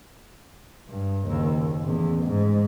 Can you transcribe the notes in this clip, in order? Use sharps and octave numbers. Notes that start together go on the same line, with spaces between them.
G2
F#1 D#2
A1 E2
G#2